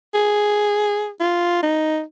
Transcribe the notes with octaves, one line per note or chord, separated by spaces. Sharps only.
G#4
F4
D#4